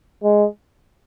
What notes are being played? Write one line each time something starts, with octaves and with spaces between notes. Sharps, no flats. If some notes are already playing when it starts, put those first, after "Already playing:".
G#3